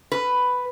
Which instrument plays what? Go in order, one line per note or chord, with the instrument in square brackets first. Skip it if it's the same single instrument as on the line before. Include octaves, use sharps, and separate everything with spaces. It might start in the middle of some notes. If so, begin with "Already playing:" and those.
[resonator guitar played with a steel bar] B4